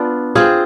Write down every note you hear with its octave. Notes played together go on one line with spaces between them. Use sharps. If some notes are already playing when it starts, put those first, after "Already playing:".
Already playing: B3 D4 F4
C4 F4 G#4